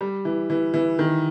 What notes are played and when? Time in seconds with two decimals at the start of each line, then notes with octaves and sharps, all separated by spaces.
0.01 G3
0.25 E3
0.50 E3
0.74 E3
0.99 D#3